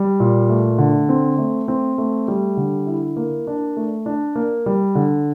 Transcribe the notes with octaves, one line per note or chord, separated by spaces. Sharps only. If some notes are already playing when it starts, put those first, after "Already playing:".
Already playing: G3
A#2
A3
D3
C4
A3
C4
A3
G3
D3
E4
A#3
D4
A3
D4
A#3
G3
D3